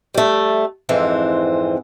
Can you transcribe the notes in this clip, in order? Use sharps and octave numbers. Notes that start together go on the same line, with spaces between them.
G3 A3
F2 G#2 E3 C4